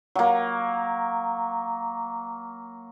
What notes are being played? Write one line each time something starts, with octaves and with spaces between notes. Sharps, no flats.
F#3 A#3